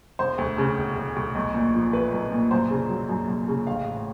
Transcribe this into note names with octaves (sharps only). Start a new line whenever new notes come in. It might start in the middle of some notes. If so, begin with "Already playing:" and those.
E1 C5
D2
C#3
E1
E1
D2
B1
A#2
F3
A3 B4
B1
A#2
F#2 C5
C#3
F#3
F#2
F#2
C#3
A1 F5
A2